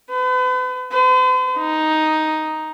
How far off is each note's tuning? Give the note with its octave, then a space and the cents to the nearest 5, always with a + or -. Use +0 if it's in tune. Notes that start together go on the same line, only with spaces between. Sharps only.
B4 +40
C5 -45
D#4 +5